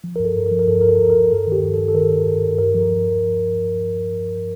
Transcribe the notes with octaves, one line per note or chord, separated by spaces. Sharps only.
F3
G2 A#4
A4
G2
A#4
F3
A#4
G2 A4
G2 A#4
A4
G2
G2 A#4
G2 A4
D#3
G4
G2
G2 A4
A4
D#3 A#4
G2
G2
G2
G2 A#4
F3